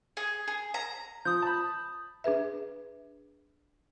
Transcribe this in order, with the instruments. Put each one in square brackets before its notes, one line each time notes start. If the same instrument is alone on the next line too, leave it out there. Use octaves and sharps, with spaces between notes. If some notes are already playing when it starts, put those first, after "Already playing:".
[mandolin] G#4
G#4
A#5
[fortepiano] F3 [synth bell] D#6 G6
[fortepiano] A5 B5
[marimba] D4 G#4 B4 E5